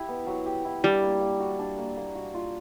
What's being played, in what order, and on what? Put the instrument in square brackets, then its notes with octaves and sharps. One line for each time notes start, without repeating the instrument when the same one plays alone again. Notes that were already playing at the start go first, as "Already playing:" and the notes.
Already playing: [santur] E4 G4
B3
F#3
G4
E4
[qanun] G3 [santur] D4
[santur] A#3
A#3
F#4
D4
A#3
A#3
F#4
F4